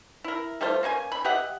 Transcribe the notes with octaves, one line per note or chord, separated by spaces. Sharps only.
E4 A#4
G3 A3 F4 C5
A#3 C#4 C5 G#5
B5
G4 D#5 E5 F#5